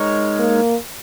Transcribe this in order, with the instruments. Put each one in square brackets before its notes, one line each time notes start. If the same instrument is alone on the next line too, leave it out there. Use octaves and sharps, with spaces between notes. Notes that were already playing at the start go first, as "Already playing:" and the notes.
Already playing: [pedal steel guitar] G#3 D#4 A#4 C#5
[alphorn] A#3